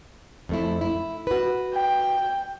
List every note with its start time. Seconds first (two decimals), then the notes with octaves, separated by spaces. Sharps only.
0.49 F2 A3 E4
0.81 E4
1.27 F#4 B4
1.74 G5